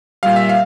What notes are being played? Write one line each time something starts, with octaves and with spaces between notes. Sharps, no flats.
A#2 G3 F5
E5
F5